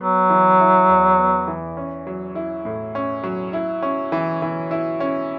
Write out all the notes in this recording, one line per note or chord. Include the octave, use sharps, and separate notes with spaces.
F#3 B3
E3
E4
E2
B3
E3
C#4
F#3
E4
A2
C#4
F#3
E4
C#4
E3
E3
E4
C#4